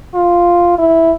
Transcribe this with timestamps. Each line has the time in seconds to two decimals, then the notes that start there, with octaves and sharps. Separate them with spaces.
0.14 F4
0.78 E4